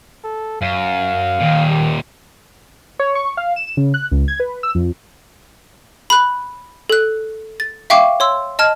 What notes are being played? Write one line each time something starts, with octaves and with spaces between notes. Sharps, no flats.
A4
F#2 F5
D#2 A#2 D#3
G4
C#5
C#6
F5
E7
C#3
F#6
C#2
G#6
B4
E6
F2
B5 F#6
A4 F#6
A6
E5 F5 G5 C#6 D6
C#5 C6 E6
D#5 A5 F6 G#6